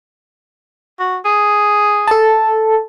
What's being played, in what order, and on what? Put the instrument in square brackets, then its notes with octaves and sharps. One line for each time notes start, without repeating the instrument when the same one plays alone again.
[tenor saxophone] F#4
G#4
[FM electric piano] A4 A5